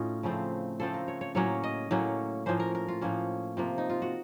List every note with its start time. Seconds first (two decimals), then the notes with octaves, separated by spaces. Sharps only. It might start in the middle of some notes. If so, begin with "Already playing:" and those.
Already playing: A2 C#4 D#4 F4
0.23 C#3 F3 A3 C4
0.80 C#3 F3 A3 C4 A4
0.94 A#4
1.08 C#5
1.21 C#5
1.35 A2 F#3 A#3 C#4 C#5
1.64 D#5
1.91 A2 F#3 A#3 C#4
2.46 A2 F3 A#3 C#4 C5
2.60 A#4
2.75 A#4
2.88 F4
3.01 A2 F3 A#3 C#4
3.57 C3 F3 A#3
3.78 D#4
3.90 F4
4.02 F#4